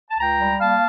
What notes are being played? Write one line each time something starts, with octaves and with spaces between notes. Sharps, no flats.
A5
C#2 G5 A#5
G3
A#3 F5 A5